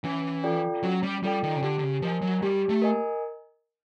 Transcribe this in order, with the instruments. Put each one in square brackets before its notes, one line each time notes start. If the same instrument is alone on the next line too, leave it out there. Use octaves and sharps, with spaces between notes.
[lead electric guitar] E3 [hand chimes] C#4
[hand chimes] F4 A4 D5 G5
[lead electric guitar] F#3 [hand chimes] C#4
[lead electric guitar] G3
[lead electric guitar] G3 [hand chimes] F4 A4 D5 G5
[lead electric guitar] D#3
C#3
[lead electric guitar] D3 [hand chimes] G4
[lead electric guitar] D3
C#3
[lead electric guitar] F3 [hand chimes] A#4 D#5 G#5
[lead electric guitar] F#3
[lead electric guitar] G3 [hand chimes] G4
[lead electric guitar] A3
[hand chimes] A#4 D#5 G#5